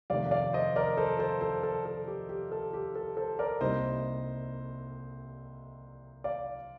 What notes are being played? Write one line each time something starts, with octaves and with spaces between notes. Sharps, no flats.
F2 C3 D#3 A3 D5 F5
D5 F5
C5 D#5
A#4 D5
A4 C5
A4 C5
A4 C5
A4
A4
G4
G4
A4
G4
A4
A4 C5
A#4 D5
C2 C3 G3 A#3 D#4 C5 D#5
D5 F5